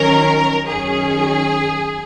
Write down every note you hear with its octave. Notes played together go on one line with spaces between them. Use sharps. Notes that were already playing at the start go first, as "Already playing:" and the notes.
Already playing: D#3 F#3 C#4 A#4
F#2 D#3 F#3 C#4 G#4